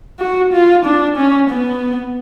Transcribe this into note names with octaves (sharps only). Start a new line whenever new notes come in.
F#4
F4
D4
C#4
B3